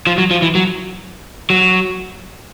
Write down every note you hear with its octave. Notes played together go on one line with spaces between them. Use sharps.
F3
F#3
F3
E3
F#3
F#3